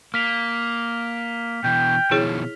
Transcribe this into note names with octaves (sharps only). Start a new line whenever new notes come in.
A#3 F6 B6 F7
B2 E3 G5
B2 D#3 F3 E4 G#4 C#5